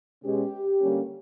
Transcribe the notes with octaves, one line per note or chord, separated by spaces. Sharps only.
B2 G#3 C#4 G4
D3 G3 A#3 C#4